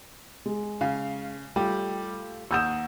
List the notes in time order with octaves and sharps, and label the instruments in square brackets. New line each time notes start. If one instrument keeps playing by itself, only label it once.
[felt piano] G#3
[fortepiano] C#3 [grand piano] F5
[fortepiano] G3 [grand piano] A3 F4 G4 [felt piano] G5
[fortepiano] D#2 [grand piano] F#5 D#6 [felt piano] E6 G6 E7